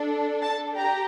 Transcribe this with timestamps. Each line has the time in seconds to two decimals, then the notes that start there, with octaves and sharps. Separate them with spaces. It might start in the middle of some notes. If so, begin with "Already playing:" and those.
Already playing: D4 A4
0.42 A5
0.76 G4 A#5